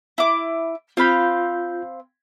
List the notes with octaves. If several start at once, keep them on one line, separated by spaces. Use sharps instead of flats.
E4 D6
C4 F4 F5 B5 G6